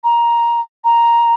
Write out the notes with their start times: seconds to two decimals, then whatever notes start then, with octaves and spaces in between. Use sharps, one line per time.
0.04 A#5
0.84 A#5